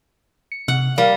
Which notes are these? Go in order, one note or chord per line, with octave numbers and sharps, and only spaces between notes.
C#7
C3 F#5
G3 A#4 F5